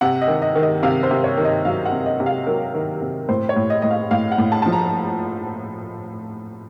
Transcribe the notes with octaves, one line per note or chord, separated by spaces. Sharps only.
C3 F#5
D#5
D#3
D#5
D#3
D#5
C3 F5
C5
C3
C#5
D#3
D#5
F#3 F5
F#5
C3
D#5
C3
F5
F#3 A#4
D#3
C3
A2 C5
C#5
A2
D#5
A2 D#5
F5
A2 F5
F#5
A2
A5
F3 A5
A#5